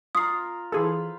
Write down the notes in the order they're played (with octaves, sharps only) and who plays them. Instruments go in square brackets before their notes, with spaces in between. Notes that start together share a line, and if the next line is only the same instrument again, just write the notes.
[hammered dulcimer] F4 A#4 [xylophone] D#6 C7
[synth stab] E3 G#4 A4 [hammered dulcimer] C5 F5 B5